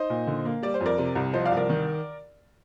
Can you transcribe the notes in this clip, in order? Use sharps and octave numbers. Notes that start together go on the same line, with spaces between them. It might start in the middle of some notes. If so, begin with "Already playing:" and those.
Already playing: D#4 C5 D#5
A#2
D3
A#3
G3 D5
C5
F2
A#4 D5
C3
C2
F3 C5 D#5
D5 F5
C2
A#4 D5
D#3